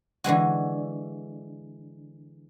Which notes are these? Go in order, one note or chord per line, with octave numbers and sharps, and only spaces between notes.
D3 E3 G#3 F#4